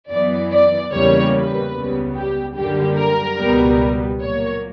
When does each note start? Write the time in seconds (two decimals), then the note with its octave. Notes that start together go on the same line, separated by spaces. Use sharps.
0.10 F#2 E3 B3 D5
0.51 D5
0.92 E2 C#3 G3 A#3 C#5
1.34 B4
1.74 C#2 C#3 G3 B3
2.16 G4
2.56 F#2 D3 G3 A#3 G4
2.97 A#4
3.39 C#2 B2 G3 B3
4.21 A#2 F#3 A#3 C#5